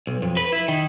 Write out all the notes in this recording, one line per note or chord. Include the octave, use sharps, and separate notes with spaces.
B1
F2
B4
E4
D#3